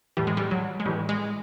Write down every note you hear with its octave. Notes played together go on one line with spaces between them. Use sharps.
A2 E3 G3
G#3
G3
F#3
G#3
A2 E3 G3
G#3